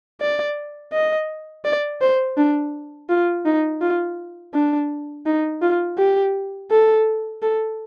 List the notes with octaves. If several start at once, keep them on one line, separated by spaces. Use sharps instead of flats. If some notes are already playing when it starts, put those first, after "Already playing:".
D5
D#5
D5
C5
D4
F4
D#4
F4
D4
D#4
F4
G4
A4
A4